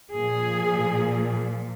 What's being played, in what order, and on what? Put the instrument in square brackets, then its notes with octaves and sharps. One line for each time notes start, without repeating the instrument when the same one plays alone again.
[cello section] A#2 F3 G#4